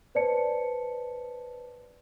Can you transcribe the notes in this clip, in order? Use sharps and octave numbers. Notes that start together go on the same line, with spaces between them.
B4 C5 D5 A5 C#7